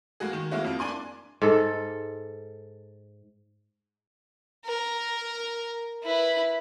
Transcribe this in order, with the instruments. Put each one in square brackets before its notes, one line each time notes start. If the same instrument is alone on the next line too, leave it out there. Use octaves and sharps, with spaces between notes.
[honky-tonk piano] G#3 A#3 F#4 G#4
D#3
G#3 A#3 C#4 E4 F#4
F2 A#3
D4 G#5 C6 D6
[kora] G#2 A4
[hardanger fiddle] A#4
E4 B4